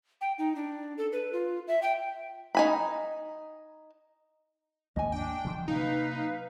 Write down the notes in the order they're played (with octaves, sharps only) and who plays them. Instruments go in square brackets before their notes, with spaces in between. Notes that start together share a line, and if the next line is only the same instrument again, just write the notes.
[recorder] G5
D#4
D4
A4
B4
F4
E5
G5
[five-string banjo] D#4 G#5 B5
[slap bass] G#1 D#2 A#3 [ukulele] D#5 G#5
[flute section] D4 [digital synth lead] G5
[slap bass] D3 E3 F3
[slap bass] C3 F#3 A#3 [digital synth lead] D#4 [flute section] B4 F5